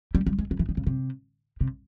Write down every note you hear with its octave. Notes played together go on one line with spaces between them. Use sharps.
G3
G3
G#3
F#3
E3
D#3
C#3
C3
C3